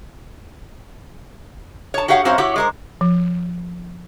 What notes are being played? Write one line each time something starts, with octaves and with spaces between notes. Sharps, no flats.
C#5 A5
F#4 G4 C#5 F5 F#5
F#2 C4 F#4 C5 C#5 F5
E4 F#4 G4 C#5
G#3 A#4 C5
F3